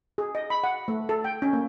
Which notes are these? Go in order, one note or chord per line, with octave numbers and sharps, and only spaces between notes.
G#4
D#5
B5
F#5
A3
A4
G5
C#4
A#3